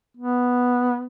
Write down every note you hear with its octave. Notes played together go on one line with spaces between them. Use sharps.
B3